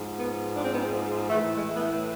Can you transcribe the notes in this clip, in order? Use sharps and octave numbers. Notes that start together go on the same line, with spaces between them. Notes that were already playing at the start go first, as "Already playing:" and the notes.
Already playing: G#2 F3
B3
D4
C4
B3
C4
A2 E3 A3
G#3
B3
A3